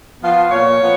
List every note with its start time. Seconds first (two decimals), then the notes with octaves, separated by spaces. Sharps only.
0.21 F3 B3 F4 F5
0.51 A#2 C#5
0.81 F3 B3